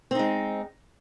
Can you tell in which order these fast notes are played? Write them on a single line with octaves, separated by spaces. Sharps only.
C4 D#4 G#3